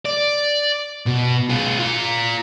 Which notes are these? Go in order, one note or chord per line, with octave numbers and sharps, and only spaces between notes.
D5
B2
F4 G#4
F4 A#5